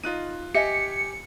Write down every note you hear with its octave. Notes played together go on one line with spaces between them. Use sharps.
D#4 F4 D#5 F#6 D#7
G4 D#5 E5 G#5 C#7